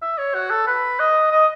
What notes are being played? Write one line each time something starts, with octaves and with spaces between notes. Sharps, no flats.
E5
C#5
F#4
A4
B4
D#5
D#5